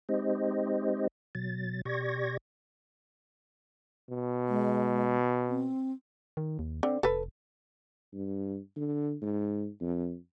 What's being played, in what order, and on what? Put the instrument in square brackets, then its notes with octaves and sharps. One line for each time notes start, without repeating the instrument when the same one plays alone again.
[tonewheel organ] G#3 C4 D#4 G4 C5 D#5
B2 F#3 A6
B2 G4 D5 C#6 G#6 A#6
[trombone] B2
[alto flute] G#3
C4
[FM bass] D#3
D#2
[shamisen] D3 [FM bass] C4
[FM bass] F1 [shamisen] A4 B4
[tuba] G2
D3
G#2
F2